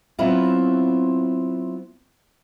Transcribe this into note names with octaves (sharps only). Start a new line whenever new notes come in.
F#3 B3 C4 E4 F4